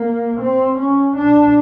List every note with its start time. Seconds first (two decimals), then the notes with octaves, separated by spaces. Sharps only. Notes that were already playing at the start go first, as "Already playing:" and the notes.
Already playing: A#3
0.41 C4
0.79 C#4
1.17 D4